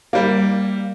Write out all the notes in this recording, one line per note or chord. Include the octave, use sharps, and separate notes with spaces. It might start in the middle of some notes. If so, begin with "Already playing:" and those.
G3 A#3